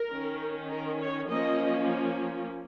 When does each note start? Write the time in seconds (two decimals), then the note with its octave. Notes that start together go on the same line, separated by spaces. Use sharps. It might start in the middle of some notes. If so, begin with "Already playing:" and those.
Already playing: A#4
0.12 D#3 C#4
0.70 A#4
0.99 C#5
1.29 F3 A#3 C#4 D#5